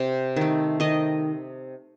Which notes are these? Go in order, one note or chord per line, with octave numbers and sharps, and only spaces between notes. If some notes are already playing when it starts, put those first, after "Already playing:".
Already playing: C3
D#3 A3
D#3 D#5